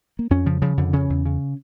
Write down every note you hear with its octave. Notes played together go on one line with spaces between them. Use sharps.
A#3
F2 C#4
C#3 F3
C#3 F3
F2 D3
C#3 C#4
E2
C#3